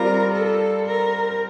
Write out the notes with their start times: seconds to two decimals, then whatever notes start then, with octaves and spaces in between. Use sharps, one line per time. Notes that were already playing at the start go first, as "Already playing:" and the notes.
Already playing: G3 C4 F4 A#4
0.33 A4
0.86 A#4